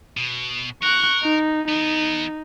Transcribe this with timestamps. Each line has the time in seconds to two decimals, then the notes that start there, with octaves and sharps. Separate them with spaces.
0.17 B2
0.83 A#4 C#6 F#6
1.23 D#4
1.68 E2 B3 D#4